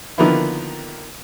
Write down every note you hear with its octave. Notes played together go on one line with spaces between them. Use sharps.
D3 D#3 F3 A#3 B3 E4